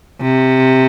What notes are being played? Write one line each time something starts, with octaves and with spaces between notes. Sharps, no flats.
C3